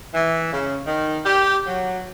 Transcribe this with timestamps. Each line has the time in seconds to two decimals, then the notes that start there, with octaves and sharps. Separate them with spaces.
0.14 E3
0.53 C#3
0.86 D#3
1.24 G4
1.67 F#3